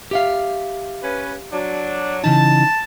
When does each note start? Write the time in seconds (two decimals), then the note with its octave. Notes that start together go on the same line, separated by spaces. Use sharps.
0.11 G4 E5 F5
1.03 C#4 B4
1.53 F#3 D4
2.24 C#3 E3 D#4 A5